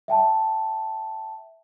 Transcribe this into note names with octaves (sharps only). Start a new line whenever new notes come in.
E5 G5 A5